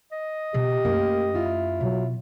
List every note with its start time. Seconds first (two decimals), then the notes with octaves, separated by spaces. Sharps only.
0.12 D#5
0.54 B2 G4
0.85 F#2 A3 A#3
1.34 E4 F4
1.81 B2 F#3